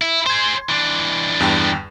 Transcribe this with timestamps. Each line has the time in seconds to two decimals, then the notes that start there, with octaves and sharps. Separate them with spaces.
0.01 E4
0.26 G#4 C5 C6 G#6
0.69 E3 D4
1.40 E2 G2 G5